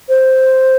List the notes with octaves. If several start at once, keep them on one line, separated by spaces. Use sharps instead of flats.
C5